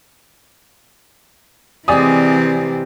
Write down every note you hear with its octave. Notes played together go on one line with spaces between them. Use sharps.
C3 E3 G#3 C4 D5 G#5 D#6